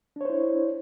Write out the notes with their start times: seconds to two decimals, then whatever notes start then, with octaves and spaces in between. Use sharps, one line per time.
0.16 D4
0.21 C#5
0.25 C5
0.30 E4